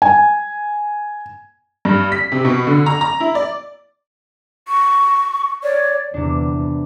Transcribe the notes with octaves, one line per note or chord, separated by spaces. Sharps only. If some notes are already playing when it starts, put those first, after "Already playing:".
G#5
G2
B6
C3
B2
D3
A#5
A#5
E4
D5
C#6
C#5 D5
E2 C3 E3 D4